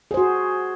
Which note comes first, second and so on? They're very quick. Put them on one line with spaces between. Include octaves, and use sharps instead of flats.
G#4 C5 F#4